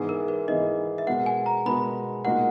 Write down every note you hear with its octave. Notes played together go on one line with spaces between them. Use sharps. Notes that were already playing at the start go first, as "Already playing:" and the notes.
Already playing: G#2 E3 B3 E4 G#4
A#4
B4
G#2 E3 B3 E4 G#4 D#5
E5
B2 G#3 B3 F#4 A#4 F#5
G#5
A#5
B2 G#3 B3 F#4 A#4 B5
A#2 G#3 D#4 F#4 A#4 F#5